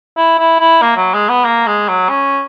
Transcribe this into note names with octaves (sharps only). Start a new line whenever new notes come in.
E4
E4
E4
A#3
F#3
G#3
B3
A#3
G#3
F#3
C#4